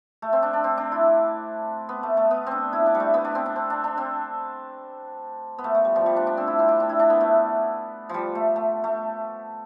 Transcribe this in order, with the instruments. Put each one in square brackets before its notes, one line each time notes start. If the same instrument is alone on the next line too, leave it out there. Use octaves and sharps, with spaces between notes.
[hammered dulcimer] A3
C4
D4
D4
C4
D4
E4
B3
A3
A3
B3
C4 D4
E4
D4
G3
A3
B3
D4
C4
D4
C4
D4
D4
C4
B3
A3
A3
G3
F3
G3
D4
D4
C4
E4
C4
D4
D4
E4
D4
B3
A3
F3 G3
A3
A3
A3